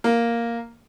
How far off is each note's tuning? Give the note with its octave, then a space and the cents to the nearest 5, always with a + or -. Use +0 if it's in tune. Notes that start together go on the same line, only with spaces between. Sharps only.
A#3 +0